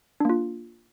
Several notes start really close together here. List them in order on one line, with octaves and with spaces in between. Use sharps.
D4 A#3 F4